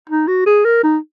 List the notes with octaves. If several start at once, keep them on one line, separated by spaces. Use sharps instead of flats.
D#4
F#4
G#4
A#4
D#4